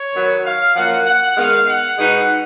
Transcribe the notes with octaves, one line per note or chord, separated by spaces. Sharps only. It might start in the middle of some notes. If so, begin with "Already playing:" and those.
Already playing: C#5
D#3 F#3 B3
F5
F#2 F3 A#3 F#5
F#5
D#3 G#3 B3 F5
F#5
B2 G#3 D#4